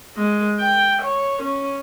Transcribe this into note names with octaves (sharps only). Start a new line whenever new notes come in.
G#3
G5
C#5
C#4